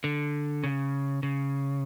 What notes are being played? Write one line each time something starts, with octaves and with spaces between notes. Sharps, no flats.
D3
C#3
C#3